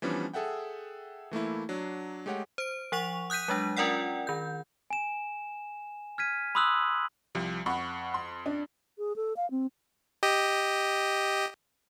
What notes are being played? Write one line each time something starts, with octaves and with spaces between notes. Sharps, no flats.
E3 F3 G3 B3 C#4 D4
G#4 A4 E5 F#5 G5
E3 A3 A#3 E4
F#3 D4
G#3 A3 G4 C#5 F#5
C5 D7
F3 F#5 C#6 F7
D#6 F#6 G6 B6 D#7
F#3 G#3 D4
C#4 F4 A#4 D5 F#5 G5
D#3 G6
G#5 E7
F6 G#6 B6 D#7
B5 C6 D#6 E6 F#6 F#7
C2 F3 G3
F2 F#5 B5 C#6
C6
D4
G#4
A4
F5
C4
G4 D#5